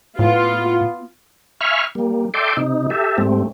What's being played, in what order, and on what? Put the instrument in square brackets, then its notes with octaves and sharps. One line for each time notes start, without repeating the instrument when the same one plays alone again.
[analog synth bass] A2 [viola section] B3 F4
[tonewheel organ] E5 F5 G#5 B5 C#6 F6
G3 A#3
A4 D5 E5 G5 C6 D6
C3 D#4
G4 A4 E5
G#2 G3 A3 C4